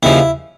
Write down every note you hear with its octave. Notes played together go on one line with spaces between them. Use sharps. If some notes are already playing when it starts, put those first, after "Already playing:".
D#2 C#3 F3 E4